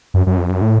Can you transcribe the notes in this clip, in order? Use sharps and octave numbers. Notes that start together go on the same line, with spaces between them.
F#2
F#2
F2
F#2
A2